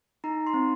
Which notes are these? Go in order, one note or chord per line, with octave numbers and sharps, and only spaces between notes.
D#4 A#5
C6
C4